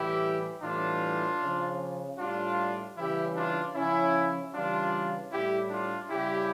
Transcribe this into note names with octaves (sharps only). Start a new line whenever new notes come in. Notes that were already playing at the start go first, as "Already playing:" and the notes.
Already playing: A2 E3 G3 E4 G4
A2 E3 G3 D4 F4
C#3 F3
A2 G3 D4 F4
C#3 E3 G3 E4 G4
D4 F4
C#3 F3 C#4 E4
C#3 E3 G3 D4 F4
A2 G3 E4 G4
D4 F4
C#3 G3 E4 G4